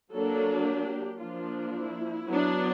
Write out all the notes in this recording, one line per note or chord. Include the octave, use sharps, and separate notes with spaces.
F#3 A#3 D4 A4
G4
F3 A#3 D4 F4
E4
F#3 B3 D4